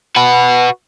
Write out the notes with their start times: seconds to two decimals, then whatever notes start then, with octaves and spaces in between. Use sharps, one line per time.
0.16 F#4 B4